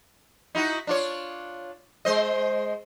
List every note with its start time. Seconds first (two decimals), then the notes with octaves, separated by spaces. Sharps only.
0.55 D#4 E4 F#4
0.87 D4 F4 C#5
2.05 G#3 C5 D#5